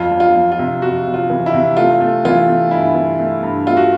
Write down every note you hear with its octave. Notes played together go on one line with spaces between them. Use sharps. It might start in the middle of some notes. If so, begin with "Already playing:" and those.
Already playing: F2 F4
F2
F4
F2
F4
C3
F2 F#4
C3
F4
E3
E4
C3
A3 F4
A3
E3 F4
A3
G2 E4
E3
A3
G2
A3 F4
F#4